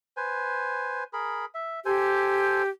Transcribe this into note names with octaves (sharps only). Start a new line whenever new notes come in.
B4 C5 G#5
G#4 A#4 B5
E5
G4 A4 C5 G#5